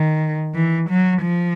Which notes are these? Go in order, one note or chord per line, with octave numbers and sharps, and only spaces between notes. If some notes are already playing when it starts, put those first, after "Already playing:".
Already playing: D#3
E3
F#3
F3